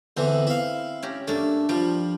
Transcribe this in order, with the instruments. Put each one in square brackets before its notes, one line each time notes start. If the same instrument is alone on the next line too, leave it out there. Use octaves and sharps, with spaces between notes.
[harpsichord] E2 D3 E3 [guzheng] C4
[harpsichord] E4 F5
[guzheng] C#4 G4 A#5
[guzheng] G2 A#3 D4 [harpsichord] A3
[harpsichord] F3 [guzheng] G3